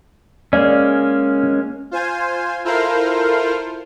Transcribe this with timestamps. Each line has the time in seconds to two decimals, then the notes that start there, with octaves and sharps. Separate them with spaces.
0.53 G#3 A#3 C#4 D5
1.91 F4 C5 G#5
2.64 E4 F4 A4 A#4 C5 F5